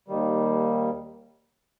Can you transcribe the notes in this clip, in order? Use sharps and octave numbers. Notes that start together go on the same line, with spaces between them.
D#2 D#3 G3